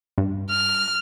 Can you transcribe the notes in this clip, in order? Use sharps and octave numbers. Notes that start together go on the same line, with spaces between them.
G2
F6